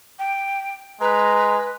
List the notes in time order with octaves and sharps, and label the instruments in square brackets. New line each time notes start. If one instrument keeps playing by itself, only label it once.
[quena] G5
[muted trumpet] G#3 [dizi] B4 [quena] A#5